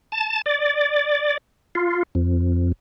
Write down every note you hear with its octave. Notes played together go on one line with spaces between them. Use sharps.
A5
D5
F4
F2